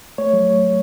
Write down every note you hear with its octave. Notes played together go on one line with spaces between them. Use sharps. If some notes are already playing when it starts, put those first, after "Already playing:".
A3 C#5
F#3